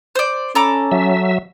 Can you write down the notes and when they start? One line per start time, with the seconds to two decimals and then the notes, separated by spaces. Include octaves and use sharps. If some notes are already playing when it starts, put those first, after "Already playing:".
0.15 C5 D5
0.55 C#4 A4 A#5 D6
0.92 F#3 E5